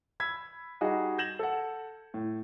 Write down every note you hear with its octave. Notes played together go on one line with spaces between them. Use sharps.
B5 E6 G#6 B6
G3 D#4 F#4 G#4
G6 G#6 A#6 E7 F#7
A4 F#5
A2